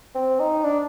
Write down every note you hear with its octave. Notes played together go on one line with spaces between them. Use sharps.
C4
D#4
D4